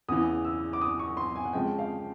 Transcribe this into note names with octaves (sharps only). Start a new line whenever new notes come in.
E2 C#3 E3 D#6
E6
D6
D#6
C#6
C6
G#5
F#5
F2 C#3 F3 G#3 G5
F5